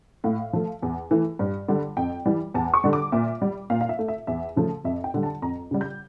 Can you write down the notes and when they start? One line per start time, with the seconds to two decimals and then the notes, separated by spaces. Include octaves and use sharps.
0.24 A2 F5
0.53 F3 A3
0.82 E2
1.11 E3 A3
1.39 G2
1.68 D3 G3
1.97 F2 G5
2.26 E3 G3
2.54 E2 A5
2.74 C#6
2.84 D3 G3
2.93 D6
3.12 A#2 E5
3.42 G3
3.70 A#2 F5
3.81 F5
3.89 E5
3.99 A3
4.08 E5
4.27 E2 E5
4.56 C#3 F3 A3
4.84 F2 E5
5.04 G5
5.14 D3 G3
5.23 A5
5.42 F2 A#5
5.71 C#3 G3
5.81 G6